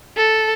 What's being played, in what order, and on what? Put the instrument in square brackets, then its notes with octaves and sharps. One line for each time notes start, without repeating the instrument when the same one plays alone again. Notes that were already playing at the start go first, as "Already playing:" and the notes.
[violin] A4